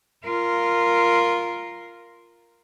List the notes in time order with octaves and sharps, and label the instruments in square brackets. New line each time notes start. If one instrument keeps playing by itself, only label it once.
[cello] F4 A#4